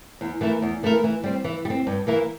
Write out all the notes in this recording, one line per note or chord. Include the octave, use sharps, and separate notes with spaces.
E2
E3 A3 E4 A#4
E2
E3 A3 E4 A#4
E3
G3 C4
E3
G3
C4
G2
E3 A#3 E4 A#4